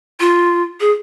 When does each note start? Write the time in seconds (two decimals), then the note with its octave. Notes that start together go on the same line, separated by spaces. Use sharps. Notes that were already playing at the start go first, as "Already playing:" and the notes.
0.20 F4
0.80 G#4